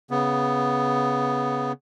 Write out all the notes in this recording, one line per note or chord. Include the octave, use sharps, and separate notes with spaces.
C#3 B3